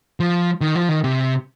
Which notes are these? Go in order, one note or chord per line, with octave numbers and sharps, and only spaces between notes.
F3
D#3
F3
D#3
C3